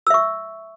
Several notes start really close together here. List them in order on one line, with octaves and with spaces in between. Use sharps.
E6 E5 C#6